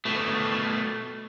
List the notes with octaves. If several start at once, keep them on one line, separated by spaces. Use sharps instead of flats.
B2 A3